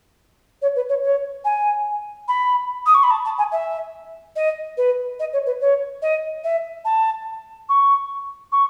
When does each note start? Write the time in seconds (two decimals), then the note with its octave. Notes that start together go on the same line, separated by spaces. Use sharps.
0.62 C#5
0.75 B4
0.89 C#5
1.03 C#5
1.44 G#5
2.28 B5
2.86 D#6
2.94 C#6
3.03 B5
3.10 A5
3.25 A5
3.38 G#5
3.52 E5
4.36 D#5
4.77 B4
5.19 D#5
5.33 C#5
5.46 B4
5.61 C#5
6.02 D#5
6.44 E5
6.85 A5
7.69 C#6
8.52 C#6